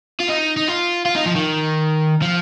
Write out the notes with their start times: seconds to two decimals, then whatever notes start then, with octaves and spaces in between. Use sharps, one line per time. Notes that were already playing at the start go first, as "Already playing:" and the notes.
0.20 F4
0.28 D#4
0.57 D#4
0.68 F4
1.06 F4
1.16 D#4
1.26 F3
1.36 D#3
2.22 F3